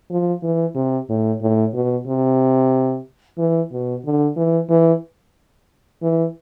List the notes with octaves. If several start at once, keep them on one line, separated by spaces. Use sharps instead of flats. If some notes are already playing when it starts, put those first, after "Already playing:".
F3
E3
C3
A2
A2
B2
C3
E3
B2
D3
E3
E3
E3